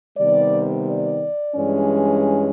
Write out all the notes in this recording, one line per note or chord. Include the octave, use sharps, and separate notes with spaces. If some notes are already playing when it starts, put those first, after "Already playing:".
C3 D#3 G3 B3 D5
D5
G2 E3 G#3 C#4